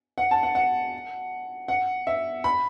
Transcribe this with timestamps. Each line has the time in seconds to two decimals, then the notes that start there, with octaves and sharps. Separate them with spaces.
0.18 F#5
0.31 A5
0.43 F#5
0.55 F#5
1.68 F#5
2.07 E5
2.44 B5